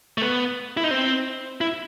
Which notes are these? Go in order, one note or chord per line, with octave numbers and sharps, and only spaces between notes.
A3
B3
E4
D#4
C4
E4